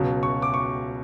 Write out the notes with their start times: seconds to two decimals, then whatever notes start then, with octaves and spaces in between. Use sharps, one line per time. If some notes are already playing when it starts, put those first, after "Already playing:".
Already playing: C#2 B2 F#3
0.23 C#6
0.42 D6
0.54 C#6